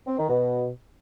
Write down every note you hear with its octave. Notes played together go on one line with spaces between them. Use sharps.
C4
D#3
B2